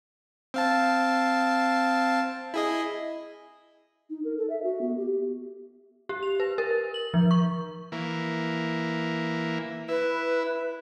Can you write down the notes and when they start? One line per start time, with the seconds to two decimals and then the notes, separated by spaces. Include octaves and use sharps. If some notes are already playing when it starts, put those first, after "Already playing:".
0.54 C4 F5 A5
2.54 E4 G#4 D#5
4.10 D#4
4.25 A#4
4.38 A4
4.50 E5
4.64 F#4
4.81 B3
4.97 G4
6.09 G4
6.23 F7
6.40 B4
6.58 A#4
6.94 F#7
7.14 F3
7.31 C#6
7.92 E3 A#3
9.88 E4 B4